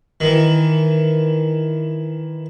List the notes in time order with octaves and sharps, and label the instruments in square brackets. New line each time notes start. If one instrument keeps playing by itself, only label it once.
[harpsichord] D#3 E3